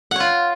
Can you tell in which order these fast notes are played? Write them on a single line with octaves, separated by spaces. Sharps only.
F#5 C#5 F4